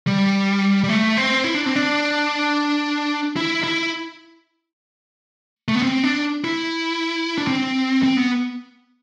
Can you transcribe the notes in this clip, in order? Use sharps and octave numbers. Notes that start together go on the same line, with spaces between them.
G3
G3
A3
C4
E4
D4
C4
D4
E4
E4
A3
B3
C4
D4
E4
D4
C4
C4
B3